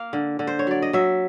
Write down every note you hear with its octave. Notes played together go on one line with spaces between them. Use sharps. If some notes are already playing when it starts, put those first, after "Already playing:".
Already playing: A#3 F5
D3
D3
C5
C#5
F#3 D5
D#5
F#3 E5